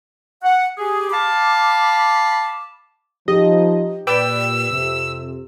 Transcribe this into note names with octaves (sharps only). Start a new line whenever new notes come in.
F#5
G4 G#4
F5 A5 B5 D6
F3 D#4 G4 D#5
A#2 B4 D5 G5 E6
F2 C3